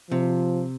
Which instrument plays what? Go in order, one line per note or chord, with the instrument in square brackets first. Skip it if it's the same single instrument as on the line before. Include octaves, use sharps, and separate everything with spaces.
[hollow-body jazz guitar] C3 [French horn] F3